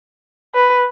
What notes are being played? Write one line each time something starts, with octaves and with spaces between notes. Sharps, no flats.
B4